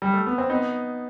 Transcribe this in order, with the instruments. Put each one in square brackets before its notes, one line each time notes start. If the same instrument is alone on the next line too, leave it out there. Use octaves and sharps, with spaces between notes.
[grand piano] G3
A3
B3
C4
B3 D#4